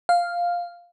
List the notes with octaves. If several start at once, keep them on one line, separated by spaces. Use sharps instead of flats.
F5